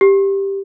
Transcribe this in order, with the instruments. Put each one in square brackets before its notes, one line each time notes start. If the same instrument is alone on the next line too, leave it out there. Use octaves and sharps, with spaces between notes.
[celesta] G4